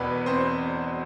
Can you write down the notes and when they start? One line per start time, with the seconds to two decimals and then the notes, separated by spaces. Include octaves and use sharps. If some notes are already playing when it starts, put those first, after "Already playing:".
Already playing: E1 E2 B2 B3 B4
0.26 C4 C5